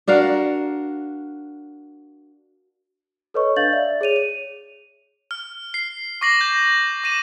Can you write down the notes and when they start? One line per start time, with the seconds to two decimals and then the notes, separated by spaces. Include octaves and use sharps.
0.08 D4 F#4 A#4 F5
3.34 A4 B4 C#5 D#5 C#6
3.56 D4 F5 G6 A6 F#7
3.72 D5 E5
4.01 G#4 C#5 D#7 F7
4.16 D#7
5.31 F6
5.74 C7
6.21 C#6 D6 A#6 C7 F#7
6.41 G6
7.04 D6 A#6 D#7 E7 F#7